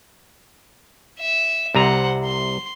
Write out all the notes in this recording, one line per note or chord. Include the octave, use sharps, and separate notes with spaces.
E5
C2 C3 C5 F#5 A#5
C6